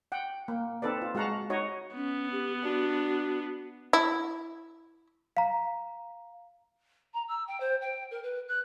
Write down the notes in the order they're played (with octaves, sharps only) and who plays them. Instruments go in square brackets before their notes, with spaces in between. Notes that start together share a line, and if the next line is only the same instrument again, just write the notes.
[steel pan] F#5 G5
A#3
C4 D#4 A4 B4 D5
F4
G#3 F#4 F5 F#5 A5 A#5
D#4 F#4 C#5 D#5
[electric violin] B3 [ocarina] C#4
[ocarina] G4
[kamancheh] D4 [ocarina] F#4
[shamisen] E4
[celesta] F5 A#5
[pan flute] A#5
E6
G5
C5
G5
A#4
B4
F#6